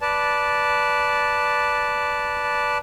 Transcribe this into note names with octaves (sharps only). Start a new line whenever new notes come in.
B4 D5 A5